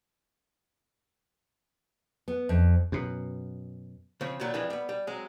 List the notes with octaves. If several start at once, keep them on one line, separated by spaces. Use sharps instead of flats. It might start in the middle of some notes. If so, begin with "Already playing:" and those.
B3
F2
F#2 B2
C#3 F3 C4 C#5
A#2 D#3 F#3 G3
F2 E3 G3 G#3
G3 B3
G3
F#3 G#3 C4